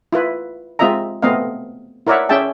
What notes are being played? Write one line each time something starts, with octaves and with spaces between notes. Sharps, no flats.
E4 F4 B4
G#3 C4 F4 D#5 E5 A#5
A3 B3 C4 D#5 F5
E4 A#4 C#5 D5 E5 F#5
C#4 G#4 E5 G5 A5